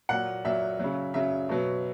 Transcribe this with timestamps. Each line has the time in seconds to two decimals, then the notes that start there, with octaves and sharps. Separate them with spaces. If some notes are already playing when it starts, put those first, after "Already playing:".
0.09 A#2 F#3 F#5
0.45 A#2 F#3 E5
0.80 C#3 F#3
1.14 C#3 F#3 E5
1.49 B2 F#3